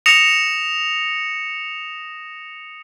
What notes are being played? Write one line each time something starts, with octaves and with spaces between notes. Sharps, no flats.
D#6 A#6 C#7 E7 F7